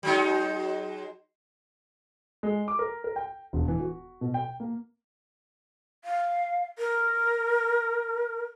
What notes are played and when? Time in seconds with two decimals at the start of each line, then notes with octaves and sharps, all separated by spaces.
0.03 F#3 G#3 D#4
2.43 G#3
2.68 D6
2.79 A#4
3.04 A#4
3.16 G5
3.53 E1
3.68 E3
3.80 F#4
4.21 B2
4.34 G5
4.60 A#3
6.05 F5
6.79 A#4